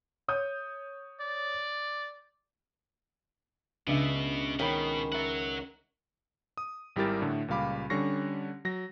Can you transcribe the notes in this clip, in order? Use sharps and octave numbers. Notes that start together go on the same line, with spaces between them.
C#5 D#6 G6
D5
C#2 B2 D4 E5
B2 D#3 C#4 F#5 G5 B5
A#4 C#5 E5 F#5 A6
D#6
G#1 G3 E4 G4 A#4 A6
A2 D3 A3
C#2 A#2 G3 F5 B5 D6
D3 G3 C#4 C#6 A#6 C7
F#3 A#6